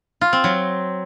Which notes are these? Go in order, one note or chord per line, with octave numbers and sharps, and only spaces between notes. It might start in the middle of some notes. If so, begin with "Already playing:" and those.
F4
C4
F#3